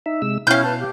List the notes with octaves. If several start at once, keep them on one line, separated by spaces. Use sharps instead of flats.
D#4 E5
C3 G#3 E6
B2 C#4 E4 F5 F6 G6
B4 A5
G4